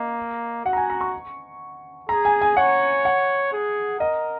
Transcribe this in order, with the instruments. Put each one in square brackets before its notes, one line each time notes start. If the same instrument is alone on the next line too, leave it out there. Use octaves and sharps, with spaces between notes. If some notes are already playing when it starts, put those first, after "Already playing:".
Already playing: [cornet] A#3 [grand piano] D#5
[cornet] F#4 [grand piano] F#5
[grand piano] A#5
G#5
A#5
C#6
[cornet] G#4 [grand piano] A#5
[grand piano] G#5
G#5
[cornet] C#5 [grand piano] F#5
[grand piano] F#5
[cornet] G#4
[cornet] A#4 [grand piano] D#5